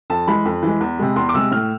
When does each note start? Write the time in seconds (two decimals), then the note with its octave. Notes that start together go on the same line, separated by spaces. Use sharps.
0.10 F2 A5
0.27 E3 G#3 B5
0.45 F2
0.63 E3 G#3
0.81 E2
0.99 C3 G#3
1.16 E2 C6
1.29 D6
1.34 C3 G#3 E6
1.52 A2 F6